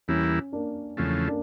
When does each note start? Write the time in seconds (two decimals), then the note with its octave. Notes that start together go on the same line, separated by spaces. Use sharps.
0.08 E2 E3 G3 A#3 C#4 E4
0.52 A#3 D4
0.97 E2 C#3 F3 A3 C#4
1.28 A#3 D4